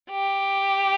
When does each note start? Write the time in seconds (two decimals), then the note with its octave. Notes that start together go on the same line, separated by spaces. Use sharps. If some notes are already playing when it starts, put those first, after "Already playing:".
0.11 G4